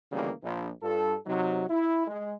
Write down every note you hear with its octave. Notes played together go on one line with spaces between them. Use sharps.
G#1 D2 C#3 E3 G3 A#3
A#1
G2 F4 A4
C3 F#3 D#4
E4
G#3